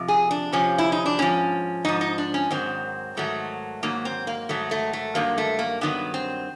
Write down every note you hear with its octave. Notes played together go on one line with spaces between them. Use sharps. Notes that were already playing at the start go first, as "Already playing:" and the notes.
Already playing: F2 C3
G#4
D4
F2 C3 F3 C#4
E4
D#4
D4
G#2 F3 C#4
G#2 F3 D#4
D#4
D4
C#4
G#2 D#3 F#3 C4
G#2 D#3 F#3 A3
G#2 D#3 F#3 A#3
C4
A#3
G#2 D#3 F#3 A3
A3
A3
G2 D#3 F#3 A#3
A3
A#3
G2 D#3 F#3 B3
C4